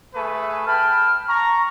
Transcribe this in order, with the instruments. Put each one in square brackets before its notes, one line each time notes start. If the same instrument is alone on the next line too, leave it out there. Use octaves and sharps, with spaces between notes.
[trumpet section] A3 G#4 B4
[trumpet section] G5 A5 B5 [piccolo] F6
[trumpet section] A#5 [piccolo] C#6